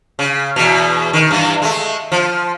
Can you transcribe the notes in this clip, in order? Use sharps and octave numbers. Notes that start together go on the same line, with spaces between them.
C#3
E2 B2
D#3
G2 E3
G#3 A3
F3